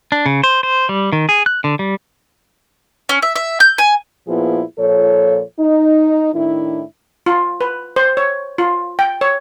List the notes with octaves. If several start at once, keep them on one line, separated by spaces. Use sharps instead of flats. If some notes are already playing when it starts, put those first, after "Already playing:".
D4
C#3
C5
C5
G3
D#3
G#4
F#6
D3
G3
C#4
E5
E5
G6
G#5
A#2 F3 B3 E4 F4 G#4
A#2 F3 A4 C#5
D#4
A2 D#3 D4 E4
F4
B4
C5
C#5
F4
G5
C#5